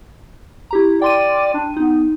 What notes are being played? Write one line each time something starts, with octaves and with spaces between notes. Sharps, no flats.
E4 G4 A#5
D5 G5 C6 D#7
D4
B3 D#4